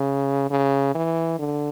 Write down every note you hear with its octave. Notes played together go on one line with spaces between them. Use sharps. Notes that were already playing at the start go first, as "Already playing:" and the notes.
Already playing: C#3
C#3
E3
D3